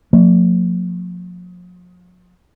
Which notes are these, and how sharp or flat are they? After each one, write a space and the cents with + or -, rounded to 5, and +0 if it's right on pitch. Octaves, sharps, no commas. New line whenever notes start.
F3 +45 A#3 -35